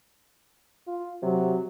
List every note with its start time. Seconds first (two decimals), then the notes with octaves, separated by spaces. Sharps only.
0.87 F4
1.22 C3 F#3